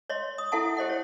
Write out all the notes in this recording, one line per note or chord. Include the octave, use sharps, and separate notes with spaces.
C#5 D#5 C6
D#6
E4 A4 E5 F#5 A5 D#6
G4 C5 D#5 F#5
C#5